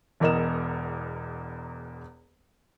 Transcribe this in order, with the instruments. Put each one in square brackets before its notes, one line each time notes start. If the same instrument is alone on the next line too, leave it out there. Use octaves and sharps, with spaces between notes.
[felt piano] E1 E2 A#4 D#5 E7